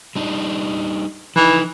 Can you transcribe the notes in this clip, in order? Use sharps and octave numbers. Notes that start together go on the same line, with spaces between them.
G3 D4 D#4
E3 F3 D#4